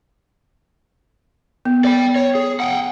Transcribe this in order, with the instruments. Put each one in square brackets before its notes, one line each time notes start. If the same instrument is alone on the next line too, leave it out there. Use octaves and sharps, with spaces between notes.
[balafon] B3
[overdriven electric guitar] D5 G5
C#5
G#4
F#5 G5